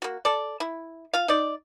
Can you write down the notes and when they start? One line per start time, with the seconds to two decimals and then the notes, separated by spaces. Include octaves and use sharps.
0.02 A#3 F#4
0.25 A4 D5
0.60 E4
1.13 F4 F5
1.28 D#4 D5